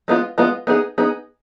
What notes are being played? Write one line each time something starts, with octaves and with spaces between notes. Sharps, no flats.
G#3 B3 F4
G#3 B3 F4
B3 D#4 G#4
B3 D#4 G#4